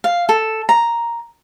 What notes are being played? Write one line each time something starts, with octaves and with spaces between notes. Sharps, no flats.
F5
A4
A#5